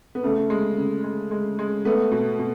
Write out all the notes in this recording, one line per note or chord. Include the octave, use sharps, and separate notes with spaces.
B3
C#3 A3
G#3
C#3
G#3
G#3
G#3
A3 B3
B2
B2